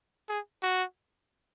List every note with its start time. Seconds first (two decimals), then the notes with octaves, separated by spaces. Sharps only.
0.29 G#4
0.62 F#4